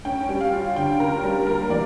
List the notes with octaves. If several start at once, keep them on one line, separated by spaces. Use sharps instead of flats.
C#4 G5
G3
F5
F4
D3 G5
C#4 A#4
G3
A#3 A#4
E3 D5